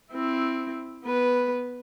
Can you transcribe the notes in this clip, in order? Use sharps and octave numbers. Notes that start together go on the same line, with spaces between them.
C4 E4
B3 B4